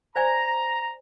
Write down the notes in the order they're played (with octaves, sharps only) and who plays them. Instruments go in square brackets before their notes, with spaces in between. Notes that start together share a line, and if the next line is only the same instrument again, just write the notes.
[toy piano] C5 D5 G#5 [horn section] A#5